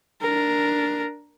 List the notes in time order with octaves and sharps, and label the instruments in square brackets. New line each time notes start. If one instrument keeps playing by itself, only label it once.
[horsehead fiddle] D4 A#4